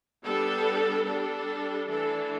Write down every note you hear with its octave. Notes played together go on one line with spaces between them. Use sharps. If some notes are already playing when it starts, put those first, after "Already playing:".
G3 B3 D4 A4
G3 D4 A4
E3 A3 D4 A4